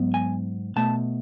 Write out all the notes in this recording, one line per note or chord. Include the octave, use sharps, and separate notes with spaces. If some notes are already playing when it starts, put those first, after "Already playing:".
Already playing: G#2 F#3 B3
G#5
B2 A3 A5